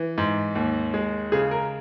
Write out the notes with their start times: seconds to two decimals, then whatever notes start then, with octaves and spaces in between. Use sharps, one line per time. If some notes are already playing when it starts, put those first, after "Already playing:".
Already playing: E3
0.18 G#2
0.55 D#2
0.94 G#3
1.32 C#3 G#4
1.51 A#4